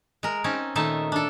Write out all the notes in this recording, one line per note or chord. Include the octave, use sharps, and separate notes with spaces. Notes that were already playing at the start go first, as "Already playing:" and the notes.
G#3 A#4
C4 C#4 D#4 A5
A#2 D#3 A3 D#4 E5 A5
D4 A4